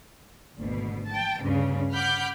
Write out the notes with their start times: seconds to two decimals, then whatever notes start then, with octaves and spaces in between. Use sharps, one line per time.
0.58 G#1 D2 B2
1.08 G5 A5
1.41 D2 G2 C#3
1.92 F#5 B5 D6 F6 G6